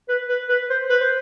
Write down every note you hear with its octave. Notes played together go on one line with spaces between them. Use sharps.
B4
B4
B4
C5
B4
C5